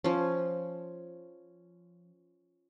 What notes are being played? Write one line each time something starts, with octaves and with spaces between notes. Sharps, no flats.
F3 C#4